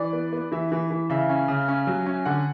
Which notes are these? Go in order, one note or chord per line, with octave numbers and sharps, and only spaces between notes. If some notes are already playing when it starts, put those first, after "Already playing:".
Already playing: E3 D5
B3
B3
E3 E5
E3
E3
C#3 E5
C#4
C#3
C#4
F#3
C#4
D3 F#5